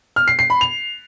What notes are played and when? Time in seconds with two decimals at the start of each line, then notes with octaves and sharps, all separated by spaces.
0.16 F6
0.28 C7
0.39 C7
0.50 B5
0.61 F7